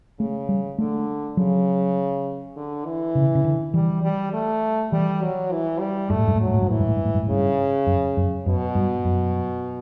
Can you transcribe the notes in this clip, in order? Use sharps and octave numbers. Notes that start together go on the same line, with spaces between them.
C#3 A3
G3
D3 A3
C#3 F#3
D3
E3
C#3
C#3
D3
E3 G3
G3
A3
E3 G3
F#3
E3
G3
G2 A3
A2
G2
A2
F#3
G2
A2
G2
A2 E3
G2
A2
G2
A2
G2
A2
G2 C#3
F#2
F#2
F#2 B2
G2
F#2